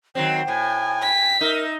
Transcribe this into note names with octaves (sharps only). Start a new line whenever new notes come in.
D#3 F#3 C4 G5
A2 G#5
B6
D#4 A#4 E5